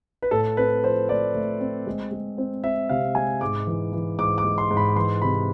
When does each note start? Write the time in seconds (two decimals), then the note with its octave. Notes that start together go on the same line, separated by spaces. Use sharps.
0.22 B4
0.31 A2 A4
0.57 C4 B4
0.83 F3 C5
1.09 A3 D5
1.35 A3
1.60 C4
1.87 G#3
2.12 G#3
2.38 C4
2.63 C4 E5
2.89 C3 F5
3.15 G#3 G#5
3.41 G#2 D6
3.67 E3
3.93 E3
4.19 G#2 D6
4.38 D6
4.44 G#3
4.58 C6
4.71 G#2
4.77 B5
4.96 E3 C6
5.22 C3 B5